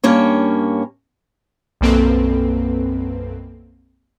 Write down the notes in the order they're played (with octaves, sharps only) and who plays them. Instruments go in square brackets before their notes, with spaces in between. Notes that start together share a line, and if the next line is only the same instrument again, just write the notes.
[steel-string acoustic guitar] G2 A#3 C#4 C#5
[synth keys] B1 F#2 A#3 C4 A4 B4